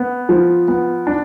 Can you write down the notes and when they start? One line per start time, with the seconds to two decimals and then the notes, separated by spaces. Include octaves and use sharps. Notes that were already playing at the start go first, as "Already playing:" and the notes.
Already playing: B3
0.29 F3
0.68 B3
1.07 D4